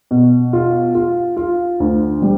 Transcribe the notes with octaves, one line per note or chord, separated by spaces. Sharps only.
B2
F4
F4
F4
D2
G3